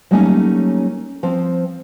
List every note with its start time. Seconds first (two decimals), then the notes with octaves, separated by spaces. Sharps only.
0.11 F#3 G3 A3 A#3 C#4 D#4
1.23 F3 C4